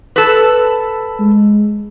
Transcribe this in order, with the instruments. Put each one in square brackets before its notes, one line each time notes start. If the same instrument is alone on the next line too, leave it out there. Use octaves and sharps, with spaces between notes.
[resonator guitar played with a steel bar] A4 B4
[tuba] G#3